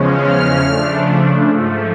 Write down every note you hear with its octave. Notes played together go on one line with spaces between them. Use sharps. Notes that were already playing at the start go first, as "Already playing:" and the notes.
Already playing: E2 C#3 F3 G#3 C#4
F6
C#3 F3 A3 D4
G#2 F3 A3